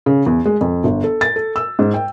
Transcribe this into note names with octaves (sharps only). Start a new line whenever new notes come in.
C#3
E2
G#3
F2
G1
A4
A6
A4
E6
G#2
G5